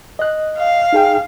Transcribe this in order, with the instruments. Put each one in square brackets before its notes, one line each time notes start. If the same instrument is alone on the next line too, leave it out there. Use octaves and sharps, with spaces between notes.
[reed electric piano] D#5 F#6
[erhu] F5
[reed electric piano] D#4 G#4 G5